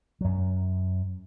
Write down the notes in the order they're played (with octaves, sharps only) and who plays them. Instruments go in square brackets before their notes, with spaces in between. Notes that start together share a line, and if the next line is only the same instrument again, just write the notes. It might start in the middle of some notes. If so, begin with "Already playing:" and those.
[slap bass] F#2 F#3